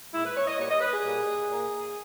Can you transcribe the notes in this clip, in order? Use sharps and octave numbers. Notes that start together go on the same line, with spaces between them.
A#2 G#3 E4
B4
C#5
D#5
A#2 G3 A#3 C#5
D#5
B4
G#4
A#2 G3 A#3
A#2 A#3